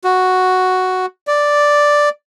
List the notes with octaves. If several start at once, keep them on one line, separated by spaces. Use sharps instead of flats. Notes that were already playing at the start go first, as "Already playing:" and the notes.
F#4
D5